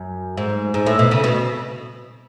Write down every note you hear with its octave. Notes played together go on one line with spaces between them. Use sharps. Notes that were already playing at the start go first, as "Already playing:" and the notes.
Already playing: F#2
G#2
G#2
A2
B2
C#3
B2